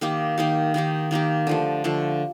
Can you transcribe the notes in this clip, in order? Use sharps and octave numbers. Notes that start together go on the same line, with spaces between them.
D#3 A#3 D#4 G4
D#3 A#3 D#4 G4
D#3 A#3 D#4 G4
D#3 A#3 D#4 G4
D3 F3 A3
D3 F3 A3